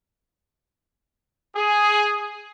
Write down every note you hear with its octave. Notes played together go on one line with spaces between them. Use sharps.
G#4